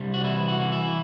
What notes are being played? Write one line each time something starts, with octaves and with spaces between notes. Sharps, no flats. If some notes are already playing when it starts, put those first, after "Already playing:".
Already playing: C2 G3 D4
F#4
E3 E4
F#4
E3
E4